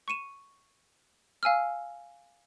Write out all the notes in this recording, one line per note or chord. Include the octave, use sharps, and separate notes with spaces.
C#6 C#7 D#7 E7
F5 G#5 E6 F6